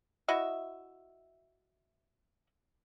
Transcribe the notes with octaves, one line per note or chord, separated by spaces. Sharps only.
E4 F#4 D#5 E5